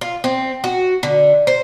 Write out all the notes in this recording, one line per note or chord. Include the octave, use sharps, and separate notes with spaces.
F4
C4
F#4
D3
C5